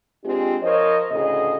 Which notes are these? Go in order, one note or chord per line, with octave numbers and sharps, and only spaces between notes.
G#3 C4 D4 F4 G4
F3 A#4 C5 C#5 D#5
D2 A2 C#3 A3 G#4 D#5